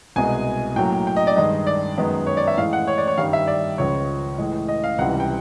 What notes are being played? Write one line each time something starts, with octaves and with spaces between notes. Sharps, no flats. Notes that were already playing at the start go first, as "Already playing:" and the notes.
C2 B2 G#3 G#5
A2 F#3 A#3 G5
G5
D#5
D5
G2 D#3 G#3 D#5
D5
F#2 D#3 G#3 B3
C#5
D5
E5
A2 E3 G#3 F5
F#5
C#5
D5
C#5
G2 D#3 G3 F5
E5
D5
C#2 C#3 F3 C#5
A2 E3 G#3
D#5
F5
C#2 C3 E3 G3 F#5
G5